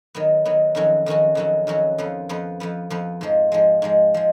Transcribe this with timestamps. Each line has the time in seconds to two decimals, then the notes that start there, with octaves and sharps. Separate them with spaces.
0.15 D#3 F#3 B3
0.45 D#3 F#3 B3
0.75 F2 D#3 F#3 C#4 F#4
1.06 F2 D#3 F#3 C#4 F#4
1.35 F2 D#3 F#3 C#4 F#4
1.67 F2 D#3 F#3 C#4 F#4
1.98 F2 F3 B3
2.29 F2 F3 B3
2.60 F2 F3 B3
2.90 F2 F3 B3
3.21 G#2 F3 G#3
3.52 G#2 F3 G#3
3.82 G#2 F3 G#3
4.14 F3 G#3